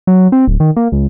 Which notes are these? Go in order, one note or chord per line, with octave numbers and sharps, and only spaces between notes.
F#3
C4
D1
D#3
A#3
C#2